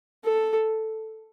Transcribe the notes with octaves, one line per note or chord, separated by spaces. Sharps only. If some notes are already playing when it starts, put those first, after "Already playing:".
A4